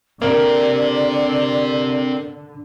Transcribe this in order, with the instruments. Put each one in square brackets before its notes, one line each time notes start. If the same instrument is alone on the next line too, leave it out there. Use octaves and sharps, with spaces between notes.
[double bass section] D3 [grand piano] A#3 [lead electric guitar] C4 G4 [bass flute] D5